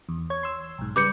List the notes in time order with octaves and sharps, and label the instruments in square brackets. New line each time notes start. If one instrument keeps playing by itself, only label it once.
[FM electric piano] E2
C#5 G#6
C6 E6
B1 G#2
[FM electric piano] C#3 G3 B4 [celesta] D6 G6 C#7